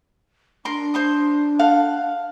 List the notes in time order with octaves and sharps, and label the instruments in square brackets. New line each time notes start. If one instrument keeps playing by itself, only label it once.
[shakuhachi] D4 [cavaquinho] A#4 C6
[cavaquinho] C5 C6 D#6
A4 F5 F#5